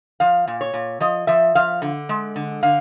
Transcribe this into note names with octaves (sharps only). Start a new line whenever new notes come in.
F3 F5
A#2
C#5
A#2
F3 D#5
F3 E5
F3 F5
D3
G#3
D3
D3 F5